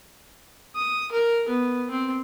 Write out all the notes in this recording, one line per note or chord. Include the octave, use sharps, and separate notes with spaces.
D#6
A#4
B3
C4